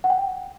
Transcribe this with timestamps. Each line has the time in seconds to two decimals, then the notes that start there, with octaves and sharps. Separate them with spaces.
0.04 F#5
0.10 G5